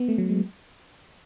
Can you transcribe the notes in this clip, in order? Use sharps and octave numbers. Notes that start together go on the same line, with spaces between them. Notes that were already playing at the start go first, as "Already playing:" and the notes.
Already playing: B3
A3
F#3
G#3